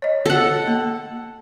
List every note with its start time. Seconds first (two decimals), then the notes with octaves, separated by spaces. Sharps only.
0.02 C#5 D#5
0.26 A4 F#5
0.67 A#3